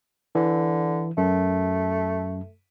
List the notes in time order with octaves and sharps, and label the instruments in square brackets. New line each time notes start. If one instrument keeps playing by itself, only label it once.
[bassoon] D3 [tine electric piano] E3
[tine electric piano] F#2 [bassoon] A3